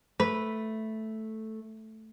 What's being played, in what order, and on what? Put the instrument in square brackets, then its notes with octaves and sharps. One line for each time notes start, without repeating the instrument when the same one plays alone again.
[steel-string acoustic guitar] A3 [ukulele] B4